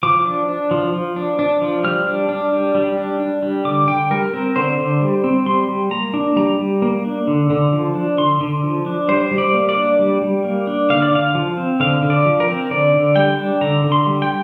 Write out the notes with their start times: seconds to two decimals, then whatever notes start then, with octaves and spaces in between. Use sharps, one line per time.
0.03 F3 D6
0.25 D4
0.48 D4
0.71 F3
0.94 F3
1.16 D4
1.39 D4
1.62 F3
1.84 G3 F6
2.06 D4
2.29 D4
2.53 G3
2.75 G3
2.97 D4
3.20 D4
3.43 G3
3.65 D3 D6
3.88 D3 G5
4.11 G3 A#4
4.34 C4 A#4
4.56 D3 C5
4.79 D3
5.01 G3
5.24 C4
5.46 G3 C6
5.69 G3
5.91 A#3 A#5
6.14 D4
6.36 G3 A#5
6.59 G3
6.82 A#3
7.05 D4
7.27 D3
7.50 D3
7.73 F3
7.95 D4
8.18 D3 C6
8.41 D3
8.63 F3
8.86 D4
9.08 G3 C5
9.31 G3
9.38 D5
9.54 A#3
9.69 D5
9.76 D4
9.99 G3
10.22 G3
10.44 A#3
10.67 D4
10.90 D3 F5
11.02 D5
11.12 D3 F5
11.35 F3
11.57 C4
11.80 D3 F5
12.02 D3
12.10 D5
12.26 F3
12.40 A#4
12.48 C4
12.71 D3 D5
12.94 D3
13.16 G3 G5
13.39 D4
13.61 D3 A#5
13.84 D3
13.92 C6
14.07 G3
14.22 G5